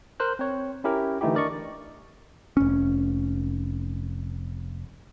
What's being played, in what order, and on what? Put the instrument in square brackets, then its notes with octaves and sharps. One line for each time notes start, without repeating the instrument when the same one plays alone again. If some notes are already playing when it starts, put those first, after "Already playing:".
[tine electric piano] A#4 C5 F#6
C4 C#5
C#4 E4 G4 A#4
D3 E3 A3 D#4 E4 G4
D4 A#4 D5 D#5 C#6
[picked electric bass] F1 C#4